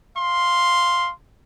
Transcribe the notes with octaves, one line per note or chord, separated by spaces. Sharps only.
F5 C6